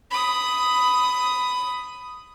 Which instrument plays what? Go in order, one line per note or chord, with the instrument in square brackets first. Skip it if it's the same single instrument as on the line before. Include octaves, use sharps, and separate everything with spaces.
[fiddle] B5 D#6